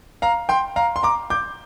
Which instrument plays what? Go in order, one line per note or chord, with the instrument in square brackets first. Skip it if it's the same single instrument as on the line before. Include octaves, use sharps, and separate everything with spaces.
[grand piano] F5 A#5
G5 C6
F5 A#5
C6
A#5 D6
D6 G6